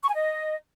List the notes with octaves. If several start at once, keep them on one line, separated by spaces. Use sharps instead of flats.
C#6
G#5
D#5